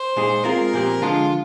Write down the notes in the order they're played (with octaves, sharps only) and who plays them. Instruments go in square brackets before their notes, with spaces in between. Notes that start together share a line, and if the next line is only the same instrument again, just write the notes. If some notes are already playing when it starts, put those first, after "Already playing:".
Already playing: [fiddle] C5
[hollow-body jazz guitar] A#2 G#3 D#4 G#4
[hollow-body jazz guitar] G#3 C4 F4 G#4 [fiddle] A#4
[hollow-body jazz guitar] A#2 F3 C4 G4
[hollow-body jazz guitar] D3 F3 G#3 [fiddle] F4